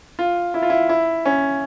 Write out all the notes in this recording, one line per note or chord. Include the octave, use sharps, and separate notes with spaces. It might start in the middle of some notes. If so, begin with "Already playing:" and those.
F4
E4
F4
E4
E4
C#4